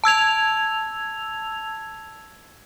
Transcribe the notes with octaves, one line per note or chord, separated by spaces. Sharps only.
A5 E6 G#6 F7